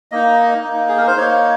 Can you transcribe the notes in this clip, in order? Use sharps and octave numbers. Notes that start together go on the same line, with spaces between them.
A#3 D#4 D#5
A#3 D#4
G#4
A#4
C5
A#3 D#4 C#5